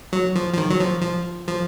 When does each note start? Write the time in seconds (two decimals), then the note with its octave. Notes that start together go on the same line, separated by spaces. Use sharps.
0.13 F#3
0.35 F3
0.53 F3
0.57 D#3
0.70 F#3
0.80 F3
1.02 F3
1.48 F3